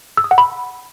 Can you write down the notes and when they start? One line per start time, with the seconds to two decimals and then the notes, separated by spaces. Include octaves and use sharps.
0.17 E6
0.24 D#6
0.31 F#5
0.38 B5